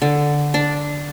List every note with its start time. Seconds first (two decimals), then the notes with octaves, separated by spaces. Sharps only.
0.02 D3
0.54 D4